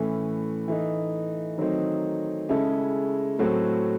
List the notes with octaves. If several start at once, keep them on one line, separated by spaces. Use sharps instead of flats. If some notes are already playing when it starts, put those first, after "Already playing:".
Already playing: A2 E3 A3 C#4
E3 A3 D#4
D#3 F#3 A3 C4 D#4
C#3 G#3 C#4 E4 A4
A2 F#3 C4 F#4 A4